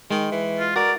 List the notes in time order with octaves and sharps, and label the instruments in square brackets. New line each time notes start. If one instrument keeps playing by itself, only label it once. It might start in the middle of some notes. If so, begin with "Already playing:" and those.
[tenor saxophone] D#3 [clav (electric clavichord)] G#3
[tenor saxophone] E3
[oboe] F4
[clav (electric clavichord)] F#4 [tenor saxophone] A#4 [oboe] D5